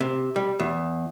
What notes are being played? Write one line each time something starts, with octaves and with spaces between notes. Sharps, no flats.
C3
G3
E2